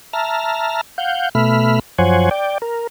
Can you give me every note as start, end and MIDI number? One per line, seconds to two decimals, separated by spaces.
0.13 0.81 76
0.13 0.81 81
0.13 0.81 82
0.13 0.81 89
0.98 1.29 77
0.98 1.29 78
0.98 1.29 91
1.35 1.79 47
1.35 1.79 57
1.35 1.79 76
1.35 1.79 83
1.35 1.79 89
1.98 2.29 42
1.98 2.29 53
1.98 2.29 72
1.98 2.29 73
1.98 2.29 78
1.98 2.29 80
2.31 2.58 74
2.31 2.58 79
2.62 2.87 70